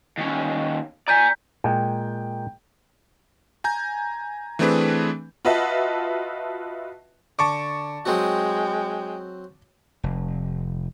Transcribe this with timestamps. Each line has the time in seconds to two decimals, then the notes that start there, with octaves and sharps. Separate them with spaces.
0.18 D#2 C#4
1.08 D5 G#5 A#5 G6 B6
1.64 A#2 G#3 G5
3.64 G#5 A#5 G6
4.59 E3 A3 C4 D4 G#4 B4
5.45 F4 F#4 B4 D#5 E5 A5
7.39 D3 A5 C#6 D6
8.05 F#3 G#3 C4 F#4 G5
10.04 F1